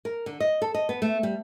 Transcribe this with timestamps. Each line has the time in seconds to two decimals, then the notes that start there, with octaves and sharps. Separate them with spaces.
0.05 A#4
0.26 D3
0.40 D#5
0.62 A4
0.74 D#5
0.89 B3
1.02 A3
1.23 G3